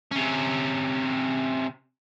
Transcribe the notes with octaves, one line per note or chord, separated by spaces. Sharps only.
C3 C#4